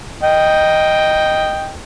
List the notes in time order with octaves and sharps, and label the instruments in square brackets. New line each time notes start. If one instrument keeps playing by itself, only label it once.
[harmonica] D#5 G5